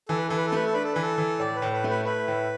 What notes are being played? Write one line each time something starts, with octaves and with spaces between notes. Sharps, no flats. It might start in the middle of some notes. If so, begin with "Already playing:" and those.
E3 A4
B4
E3 A4
B4
A4
A3 B4
A4
D4 B4
A4
E3 B4
A4
E3
A2 D5
B4
A2
B4
A3
B4
E4 B4
A2